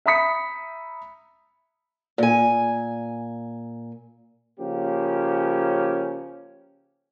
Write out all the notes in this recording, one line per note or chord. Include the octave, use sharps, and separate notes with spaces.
E5 A#5 B5 D#6 B6 C#7
A#2 G#5
C#3 F3 A#3 C#4 G4